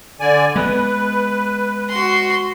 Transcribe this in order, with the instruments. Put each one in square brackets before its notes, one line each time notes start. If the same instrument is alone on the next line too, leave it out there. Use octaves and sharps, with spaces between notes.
[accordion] D3 D5 G#5
[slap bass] G#3 B3 [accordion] B4
[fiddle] F#4 C6